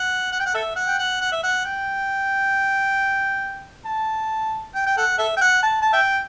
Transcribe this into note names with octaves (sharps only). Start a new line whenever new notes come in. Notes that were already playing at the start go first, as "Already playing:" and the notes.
Already playing: F#5
F#5
G5
F#5
A4 E5
F#5
G5
F#5
F#5
E5
F#5
G5
A5
G5
G5
A4 F#5
A4 E5
G5
F#5
A5
A5
E5 G5